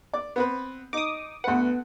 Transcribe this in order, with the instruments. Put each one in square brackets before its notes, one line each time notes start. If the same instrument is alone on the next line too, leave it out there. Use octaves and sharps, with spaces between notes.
[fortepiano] D5 D6
B3 C4 B4
[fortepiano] D#4 [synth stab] D6 D#6
[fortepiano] D2 B4 [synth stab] B3 F#5